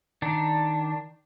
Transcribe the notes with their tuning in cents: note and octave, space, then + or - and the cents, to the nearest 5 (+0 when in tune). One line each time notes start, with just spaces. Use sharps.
D#3 +0 D4 +0